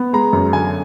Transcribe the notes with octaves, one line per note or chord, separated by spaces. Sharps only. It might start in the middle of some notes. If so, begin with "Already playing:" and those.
Already playing: B3
G#3 A#5
F#2
D3 G#5